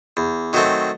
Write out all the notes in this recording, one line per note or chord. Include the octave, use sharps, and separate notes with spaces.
E2
D#3 F#3 A3 C4